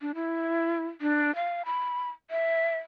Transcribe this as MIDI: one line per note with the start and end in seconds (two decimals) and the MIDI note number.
0.01 0.12 62
0.15 0.85 64
1.01 1.35 62
1.35 1.62 77
1.66 2.09 83
2.31 2.77 76